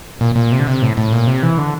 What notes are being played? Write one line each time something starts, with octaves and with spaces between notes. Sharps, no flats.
A#2
A#2
C3
D3
C3
A2
A2
A#2
C3
E3
D3